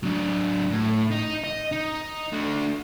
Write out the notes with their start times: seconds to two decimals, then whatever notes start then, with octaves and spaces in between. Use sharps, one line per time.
0.03 F#3 D4
0.70 A2
1.10 D#4
1.44 D#5
1.72 D#4
2.32 A3 D4